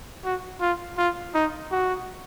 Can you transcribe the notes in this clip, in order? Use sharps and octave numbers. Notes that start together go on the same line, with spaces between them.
F#4
F4
F4
D#4
F#4